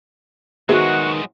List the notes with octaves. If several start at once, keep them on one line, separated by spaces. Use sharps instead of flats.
D#3 F#3 G#3 B3 F#4 G#4 C5 E5